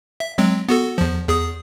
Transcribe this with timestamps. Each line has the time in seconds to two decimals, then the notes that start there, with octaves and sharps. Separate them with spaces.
0.20 E5
0.38 F#3 G#3 C4
0.69 B3 F#4 A4
0.98 E2 F3
1.28 E2 G#4 D#6